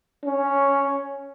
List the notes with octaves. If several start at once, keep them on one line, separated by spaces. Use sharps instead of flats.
C#4